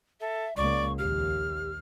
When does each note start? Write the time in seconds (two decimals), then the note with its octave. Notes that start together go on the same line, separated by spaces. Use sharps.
0.21 A4 E5
0.57 C#2 A#3 D5 C#6
0.99 A#1 D#2 G4 F6